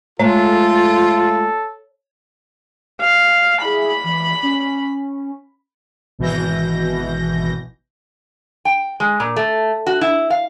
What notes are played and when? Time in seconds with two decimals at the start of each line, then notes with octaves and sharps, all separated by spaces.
0.19 G#3 A3 F4 A4 C#5
3.01 F5
3.62 E4 G#4 B5
4.04 E3
4.43 C#4
6.19 G#1 B2 E3 G6 A#6
8.65 G5
9.00 G#3
9.20 A#2
9.36 A3
9.87 F#4
10.01 E4
10.30 F5